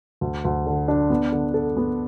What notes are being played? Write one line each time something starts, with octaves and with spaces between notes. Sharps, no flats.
D2
D2
D3
D4
B3
D3
A4
B3